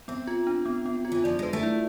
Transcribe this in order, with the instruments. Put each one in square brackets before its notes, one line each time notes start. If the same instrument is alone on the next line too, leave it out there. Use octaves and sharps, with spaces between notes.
[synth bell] B3 [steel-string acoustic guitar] C4
[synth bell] F4
D4
B3
B3
F4
[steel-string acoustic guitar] E3
[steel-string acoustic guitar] F3 [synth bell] D5
[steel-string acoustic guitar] G#3 [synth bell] B4
[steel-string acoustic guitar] A3
[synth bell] E4